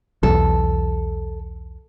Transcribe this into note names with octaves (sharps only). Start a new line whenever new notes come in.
B1 E2 A4